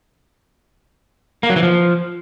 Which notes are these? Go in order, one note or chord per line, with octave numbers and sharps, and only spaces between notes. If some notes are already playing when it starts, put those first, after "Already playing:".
A#3
F#3
E3
F3